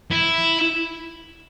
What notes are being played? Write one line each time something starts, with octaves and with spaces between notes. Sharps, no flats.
E4